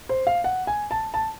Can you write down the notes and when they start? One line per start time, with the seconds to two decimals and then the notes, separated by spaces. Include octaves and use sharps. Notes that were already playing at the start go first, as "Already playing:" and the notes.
0.09 C5
0.27 F5
0.44 F#5
0.67 G#5
0.91 A5
1.14 A5